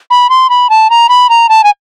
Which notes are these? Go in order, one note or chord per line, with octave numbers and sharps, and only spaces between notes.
B5
C6
B5
A5
A#5
B5
A#5
A5
G#5